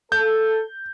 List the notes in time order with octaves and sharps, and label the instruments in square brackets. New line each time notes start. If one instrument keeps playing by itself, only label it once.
[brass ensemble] A4 [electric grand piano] G6